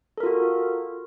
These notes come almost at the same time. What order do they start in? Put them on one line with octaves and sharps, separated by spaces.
A4 A#4 F4 F#4